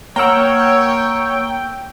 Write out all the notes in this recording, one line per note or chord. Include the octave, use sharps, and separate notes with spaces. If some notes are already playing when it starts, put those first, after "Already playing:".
A#3 A#4 C#5 F#5 G5 A#5 E6